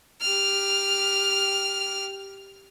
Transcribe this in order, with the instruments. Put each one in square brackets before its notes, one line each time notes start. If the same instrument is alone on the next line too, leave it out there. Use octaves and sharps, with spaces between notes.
[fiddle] G4 F6